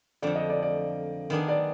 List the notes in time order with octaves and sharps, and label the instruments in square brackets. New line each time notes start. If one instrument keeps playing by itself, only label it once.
[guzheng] F2 D3 F3 [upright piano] D5
[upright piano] D#5
D5
D5
[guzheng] D#3 B3 D4 G#4
[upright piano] D5